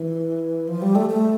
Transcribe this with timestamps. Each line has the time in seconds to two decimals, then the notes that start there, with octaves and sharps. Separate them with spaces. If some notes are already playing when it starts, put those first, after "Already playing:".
Already playing: E3
0.68 F3
0.82 G3
0.95 A3
1.09 A3